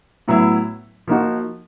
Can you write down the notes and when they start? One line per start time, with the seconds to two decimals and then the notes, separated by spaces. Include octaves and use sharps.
0.28 A2 F#3 B3 E4
1.08 F3 A#3 D#4 F#4